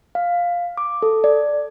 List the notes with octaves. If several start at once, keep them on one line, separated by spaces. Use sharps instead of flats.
F5
D6
A4
D5